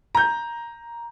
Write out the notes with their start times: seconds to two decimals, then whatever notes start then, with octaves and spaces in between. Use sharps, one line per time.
0.15 A#5 G6